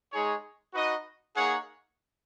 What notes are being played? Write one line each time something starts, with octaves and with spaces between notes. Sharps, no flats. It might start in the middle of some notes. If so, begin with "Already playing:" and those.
G#3 D#4 G#4 C#5
D#4 F#4 B4 D#5
A#3 D#4 G#4 C#5 F#5